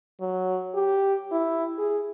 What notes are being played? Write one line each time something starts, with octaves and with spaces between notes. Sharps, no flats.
F#3
G4
E4
G#4